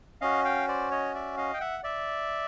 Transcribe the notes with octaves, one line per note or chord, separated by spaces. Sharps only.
C#4 F#4 D#5 F5
F5 G5
C5 D5
C#5 D#5
D5 E5
D#5 F5
G5
E5 F#5
D5 E5